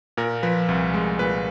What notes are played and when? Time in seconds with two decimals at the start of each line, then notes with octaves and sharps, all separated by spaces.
0.17 A#2 A#4
0.43 F3 B4
0.69 C2
0.94 G#3
1.19 A#2 B4